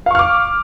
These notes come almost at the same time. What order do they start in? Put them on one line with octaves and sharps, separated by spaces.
F5 C#6 F6 D6